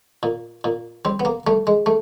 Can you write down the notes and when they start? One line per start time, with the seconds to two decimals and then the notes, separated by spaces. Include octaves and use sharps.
0.23 A#2
0.64 A#2
1.05 G3 C4
1.20 B3
1.25 A#3
1.47 G3 A3
1.67 G#3
1.86 A3